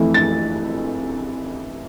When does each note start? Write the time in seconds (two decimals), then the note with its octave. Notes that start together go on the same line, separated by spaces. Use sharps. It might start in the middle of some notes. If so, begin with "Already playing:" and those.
Already playing: F2 E3 A3 E4
0.14 A6